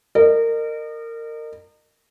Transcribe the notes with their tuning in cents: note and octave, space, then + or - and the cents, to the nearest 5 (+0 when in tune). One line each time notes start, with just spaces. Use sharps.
A#4 -25 D#5 -35